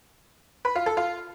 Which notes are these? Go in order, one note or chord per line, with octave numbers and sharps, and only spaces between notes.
B4
F4
A4
F4